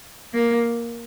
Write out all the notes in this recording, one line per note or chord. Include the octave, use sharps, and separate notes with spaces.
A#3